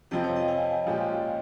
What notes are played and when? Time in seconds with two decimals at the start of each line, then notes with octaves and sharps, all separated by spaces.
0.11 F2 C3 F3 C4 F4 D#5 G5
0.24 C#5 F5
0.36 D#5 G5
0.48 F5 G#5
0.87 A#2 F3 G#3 C#4 G4